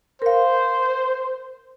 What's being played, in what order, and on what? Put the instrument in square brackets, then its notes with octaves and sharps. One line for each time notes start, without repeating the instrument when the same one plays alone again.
[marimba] A#4 F5 [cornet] C5